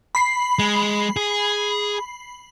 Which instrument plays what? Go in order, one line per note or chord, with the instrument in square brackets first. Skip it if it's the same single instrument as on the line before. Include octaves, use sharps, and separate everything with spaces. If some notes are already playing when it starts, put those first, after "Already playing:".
[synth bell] B5 C7
[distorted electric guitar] G#3
G#4